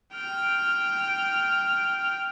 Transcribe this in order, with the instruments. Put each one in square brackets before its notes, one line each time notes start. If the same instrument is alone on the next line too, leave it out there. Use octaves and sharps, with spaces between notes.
[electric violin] G5 F6